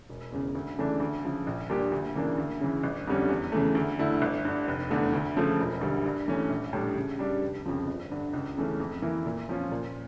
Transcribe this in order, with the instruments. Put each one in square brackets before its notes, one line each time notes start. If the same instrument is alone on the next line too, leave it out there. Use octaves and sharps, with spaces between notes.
[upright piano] E1
E2 C#3
D2
C#3 E3 A3 D4
D2
C#3 F3
A#1
A#2 G3 D4 G4
D2
C#3 E3 A#3 D4
D2
C#3 E3
G1
F2 D3 G3 C#4
E2
C#3 E3 A3
D2
D3 A3 E4
G1
G2 D3
F1
E2 D3 A3
D2
C#3 F3 A3
E1
D2 D3 G3
G2
E3 A3 C#4
A#1
A2 G3 D4
C#3
G3 D4 G4
F1
F2 C#3 F3
G1
G2 D3
C#2
C#3 E3 A3 C#4
F2
E3 A#3 E4 A#4
A#2
F3 C#4 F4
A#2